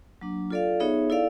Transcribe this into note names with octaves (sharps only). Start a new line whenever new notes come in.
F#3 A#3 D4
F4 A4 D5 F5
B3 D#4 G#4 C#5 E5
E4 A4 D5 F5